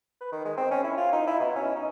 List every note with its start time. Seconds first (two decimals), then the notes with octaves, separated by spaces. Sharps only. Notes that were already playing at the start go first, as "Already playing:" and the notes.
0.21 B4
0.32 D#3
0.45 G#3
0.58 C4
0.71 C#4
0.84 E4
0.97 F4
1.13 D#4
1.27 E4
1.40 B2
1.56 C#4
1.76 D#4